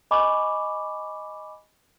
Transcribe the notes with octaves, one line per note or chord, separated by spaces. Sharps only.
D#5 G#5 B5 C#6 D6